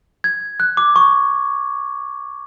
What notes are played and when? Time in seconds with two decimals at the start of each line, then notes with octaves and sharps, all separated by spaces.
0.24 G#6
0.60 F#6
0.77 D6
0.96 C#6